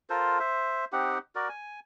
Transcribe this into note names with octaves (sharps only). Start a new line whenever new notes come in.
F4 A4 A#4 C5
C5 E5
C4 D#4 G4 F#5
F#4 A#4 D5
G#5